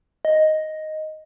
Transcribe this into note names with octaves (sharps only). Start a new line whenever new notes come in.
D#5